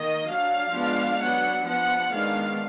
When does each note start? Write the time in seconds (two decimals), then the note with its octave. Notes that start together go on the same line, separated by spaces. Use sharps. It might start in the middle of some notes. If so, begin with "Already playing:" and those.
Already playing: D#3 A#3 D#5
0.27 F#3 D4 F5
0.73 F3 G#3 B3 D4
1.19 F#3 B3 D4 F#5
1.64 F3 B3 D4 F#5
2.10 D#3 G#3 B3 D4 F5